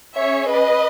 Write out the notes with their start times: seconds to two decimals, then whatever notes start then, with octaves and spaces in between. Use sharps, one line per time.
0.16 C#4 G#4 C#5 E5
0.49 B4 D#5